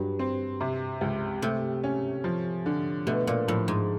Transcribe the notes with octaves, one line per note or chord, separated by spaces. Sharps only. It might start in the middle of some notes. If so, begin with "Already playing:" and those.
Already playing: G2 F#3
C4
C3
C#2
C3 A3
C#4
F3
D3
B2 A3
A#2
A2 F3
G#2